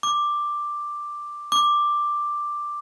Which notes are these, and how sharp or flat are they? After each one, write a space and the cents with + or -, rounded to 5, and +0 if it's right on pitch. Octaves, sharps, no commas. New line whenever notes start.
D6 +5
D6 +5